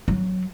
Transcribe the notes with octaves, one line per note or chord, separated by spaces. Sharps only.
F#3